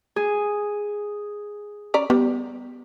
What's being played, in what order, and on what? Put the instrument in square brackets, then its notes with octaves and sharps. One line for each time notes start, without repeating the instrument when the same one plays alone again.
[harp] G#4
[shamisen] C#4 D5 A#5
[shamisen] G3 [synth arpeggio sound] B3